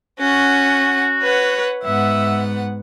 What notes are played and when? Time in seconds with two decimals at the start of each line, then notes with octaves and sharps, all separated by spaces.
0.20 C#4 F#4 F#5
1.22 B4 C#5 F#5
1.83 G#2 B3 E5 F#5